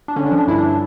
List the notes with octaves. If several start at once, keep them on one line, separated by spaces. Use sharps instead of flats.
D4
D3 C#4
D4
F3
D4
G2 E4
D4
D4